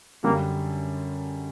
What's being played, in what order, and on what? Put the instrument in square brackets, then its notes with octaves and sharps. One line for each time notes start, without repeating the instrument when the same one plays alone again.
[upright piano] F#2 D3 G3 [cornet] A#3